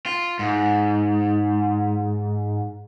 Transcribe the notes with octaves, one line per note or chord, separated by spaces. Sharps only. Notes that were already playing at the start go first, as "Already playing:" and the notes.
F4
G#2